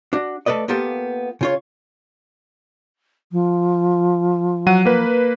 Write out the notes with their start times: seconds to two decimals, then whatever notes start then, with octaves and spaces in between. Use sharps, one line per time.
0.13 D4 F#4
0.46 A3 A4 B4 D5 D#5
0.68 A#3 B3 F4 G4 A4
1.41 C#3 F4 C#5
3.32 F3
4.67 F#3 F#5 D#7
4.85 A#3 B4